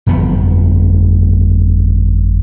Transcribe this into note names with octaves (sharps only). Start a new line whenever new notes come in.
G1 F2 B3